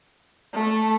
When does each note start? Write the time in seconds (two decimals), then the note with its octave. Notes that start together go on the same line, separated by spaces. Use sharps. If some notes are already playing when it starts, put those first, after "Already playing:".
0.53 A3